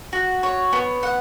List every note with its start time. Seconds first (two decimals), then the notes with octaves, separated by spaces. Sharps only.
0.13 F#4
0.43 C#5
0.73 B3
1.03 F#5